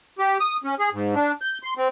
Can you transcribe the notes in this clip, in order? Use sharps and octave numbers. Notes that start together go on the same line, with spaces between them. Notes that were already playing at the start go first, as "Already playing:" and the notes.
G4
D#6
C#4
G#4
G#2
D4
G6
C6
C4